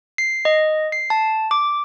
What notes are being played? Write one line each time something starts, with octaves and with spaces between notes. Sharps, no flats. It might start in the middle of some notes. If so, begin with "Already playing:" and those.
C7
D#5
C7
A5
D6